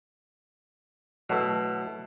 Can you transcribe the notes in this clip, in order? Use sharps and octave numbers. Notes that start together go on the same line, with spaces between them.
B2 F#3 A3 E4 A4